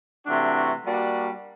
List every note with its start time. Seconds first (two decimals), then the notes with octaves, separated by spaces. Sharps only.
0.27 C3 E3 A3 D4 F#4
0.84 G3 A#3 D4 F#4